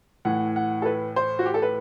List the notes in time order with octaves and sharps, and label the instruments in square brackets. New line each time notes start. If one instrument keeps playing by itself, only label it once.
[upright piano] A2 E3 F#5
F#5
A4
B4
C5
F#4
G4
A4
B4